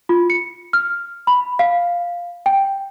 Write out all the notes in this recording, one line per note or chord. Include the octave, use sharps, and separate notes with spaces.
F4
C#7
F6
B5
F5
G5